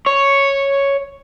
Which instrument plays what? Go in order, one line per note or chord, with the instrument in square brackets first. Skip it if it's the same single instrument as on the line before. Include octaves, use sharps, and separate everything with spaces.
[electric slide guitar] C#5